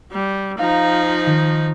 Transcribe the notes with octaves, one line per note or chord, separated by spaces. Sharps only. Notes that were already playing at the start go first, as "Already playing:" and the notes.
G3
F3 D#4 F5 A#5
D#3